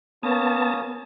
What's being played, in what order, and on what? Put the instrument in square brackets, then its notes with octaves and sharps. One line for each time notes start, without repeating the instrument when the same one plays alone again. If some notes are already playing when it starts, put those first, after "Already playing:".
[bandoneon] A#3 C#4 D#6 [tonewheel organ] B3 A5